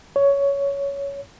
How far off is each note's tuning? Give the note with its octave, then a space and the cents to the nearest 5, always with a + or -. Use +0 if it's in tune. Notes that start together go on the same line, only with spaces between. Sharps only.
C#5 +15